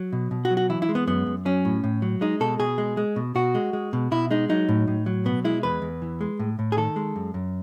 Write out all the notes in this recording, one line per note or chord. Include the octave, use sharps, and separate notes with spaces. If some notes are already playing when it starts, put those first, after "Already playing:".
Already playing: F#3
B2
B2
F#4
F#3
F#4
E3 E4
E4
G#3
B3
F#2 B3
F#2
F#3 C#4
A2
A2
F#3
G#3 D#4
B2 A4
B2 G#4
G#3
G#3
B2
B2 F#4
G#3
G#3
B2
B2 E4
G#3 D#4
F#3 D#4
A2
A2
F#3
B2 B3
G#3 E4
E2 B4
E2
E3
G#3
A2
A2
G#4
D#3 A4
G#3
F#2
F#2